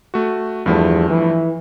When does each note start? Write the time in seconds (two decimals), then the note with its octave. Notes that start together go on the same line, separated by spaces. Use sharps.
0.14 A3 F#4
0.66 E2 G2 F3 A3
1.08 E3